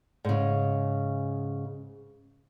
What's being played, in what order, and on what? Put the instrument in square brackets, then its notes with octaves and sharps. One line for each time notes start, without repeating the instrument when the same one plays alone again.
[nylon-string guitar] G#2 C#3